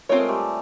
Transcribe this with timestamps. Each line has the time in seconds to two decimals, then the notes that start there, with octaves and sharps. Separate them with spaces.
0.09 A3 C4 F4 A#4 C#5
0.19 G#3
0.28 G3 A3